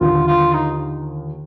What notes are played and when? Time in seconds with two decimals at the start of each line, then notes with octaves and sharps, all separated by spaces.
0.01 D#2 D3 F3 F4
0.27 F4
0.53 D#4